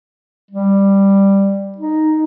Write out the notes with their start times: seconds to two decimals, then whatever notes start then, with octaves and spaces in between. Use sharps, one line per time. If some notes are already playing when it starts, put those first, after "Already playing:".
0.51 G3
1.78 D#4